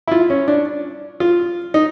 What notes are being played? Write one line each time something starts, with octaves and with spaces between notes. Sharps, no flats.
E4
F4
C#4
D4
F4
D#4